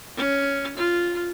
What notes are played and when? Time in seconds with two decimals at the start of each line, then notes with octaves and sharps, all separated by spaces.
0.17 C#4
0.77 F4